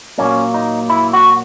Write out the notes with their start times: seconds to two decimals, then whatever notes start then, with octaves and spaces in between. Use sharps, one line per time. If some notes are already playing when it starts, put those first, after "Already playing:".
0.18 A#2 F#3 A#3 C#4
0.54 D#4
0.90 E4
1.13 F#4